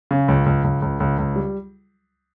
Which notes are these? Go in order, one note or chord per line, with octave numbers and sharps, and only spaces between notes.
C#3
C#2
C#2
C#2
C#2
C#2
C#2
G3